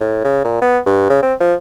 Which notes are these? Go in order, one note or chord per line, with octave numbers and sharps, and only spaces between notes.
A2
C#3
A#2
B3
G2
C#3
C4
F3